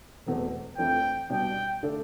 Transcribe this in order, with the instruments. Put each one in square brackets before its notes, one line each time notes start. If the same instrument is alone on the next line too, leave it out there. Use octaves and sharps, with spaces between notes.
[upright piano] E1 E2 B2 A3 C4
[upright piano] F2 E3 A3 D4 [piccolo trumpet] G5
[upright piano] B2 G3 D4 [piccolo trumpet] G5
[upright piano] D3 A3 D4